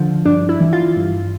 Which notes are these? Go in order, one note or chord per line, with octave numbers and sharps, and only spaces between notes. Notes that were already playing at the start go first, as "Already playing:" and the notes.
Already playing: D3 F3
G2 D4
E4
E3
F4
G2